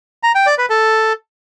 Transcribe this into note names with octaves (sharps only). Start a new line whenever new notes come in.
A#5
G5
D5
B4
A4